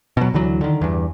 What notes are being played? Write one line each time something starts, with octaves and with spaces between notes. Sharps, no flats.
B2 F#3
D2 D3 E3 F#3
D3 D#3
E2 G2